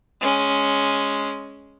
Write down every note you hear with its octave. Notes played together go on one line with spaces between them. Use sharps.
G#3 C#4